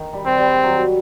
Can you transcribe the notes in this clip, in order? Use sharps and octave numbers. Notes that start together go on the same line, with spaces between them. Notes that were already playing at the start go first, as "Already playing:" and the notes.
Already playing: D#3
G3
C4
G3
F#3